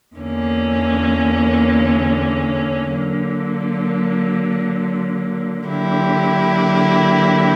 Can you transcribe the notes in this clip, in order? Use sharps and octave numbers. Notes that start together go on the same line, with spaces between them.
E2 D3 A#3 C#4
D3 F#3 A#3
D3 F#3 A#3 E4 G4